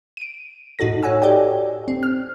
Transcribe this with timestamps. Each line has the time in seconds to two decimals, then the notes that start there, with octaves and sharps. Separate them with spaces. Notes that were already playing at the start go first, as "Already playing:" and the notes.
0.17 D7 D#7
0.79 A2 D#4 F#4 A4 A#6
1.03 C#5 F#5 G#5 E6
1.22 G4 A4 D5 D#5 G5
1.88 C4
2.03 F6